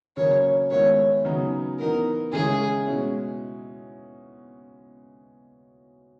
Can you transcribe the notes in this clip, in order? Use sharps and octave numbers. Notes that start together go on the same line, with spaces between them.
C#3 F#3 A#3 C#5
D#3 G#3 B3 E4 C#5
C#3 F#3 B3 D#4
E3 B3 D#4 A#4
C#3 G#3 C#4 E4 G#4
B2 G#3 C#4 E4